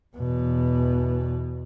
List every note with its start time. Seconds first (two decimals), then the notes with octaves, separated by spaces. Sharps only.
0.17 E2 B2